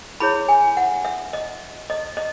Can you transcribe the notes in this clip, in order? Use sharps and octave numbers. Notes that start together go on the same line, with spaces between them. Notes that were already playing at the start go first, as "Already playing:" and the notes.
E4 G#4 C#5 B5
G#5
F#5
E5
D#5
D#5
D#5